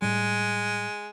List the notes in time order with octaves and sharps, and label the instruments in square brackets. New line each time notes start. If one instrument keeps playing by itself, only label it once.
[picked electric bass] A2 G3 [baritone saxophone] G#3